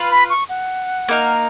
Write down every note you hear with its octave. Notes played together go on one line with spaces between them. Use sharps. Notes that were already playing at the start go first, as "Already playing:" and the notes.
Already playing: F4 B4 F5
B5
C#6
F#5
A#3 D#4 A#4